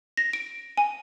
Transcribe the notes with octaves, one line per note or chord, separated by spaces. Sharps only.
A#6
D7
G#5